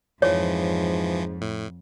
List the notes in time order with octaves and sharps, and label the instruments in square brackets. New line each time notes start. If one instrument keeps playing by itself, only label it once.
[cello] F2 [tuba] G#2 [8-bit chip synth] E3 F3 [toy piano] C#5
[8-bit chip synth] A2